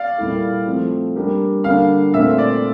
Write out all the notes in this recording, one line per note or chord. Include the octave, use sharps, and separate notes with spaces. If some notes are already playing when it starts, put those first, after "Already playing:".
Already playing: D5 F5
A#2 G3 A#3 E4 A4
F3 A3 C4
G3 A#3 D4 G4 A#4
D3 G3 A#3 D4 F5
A#2 A3 C4 E5
D5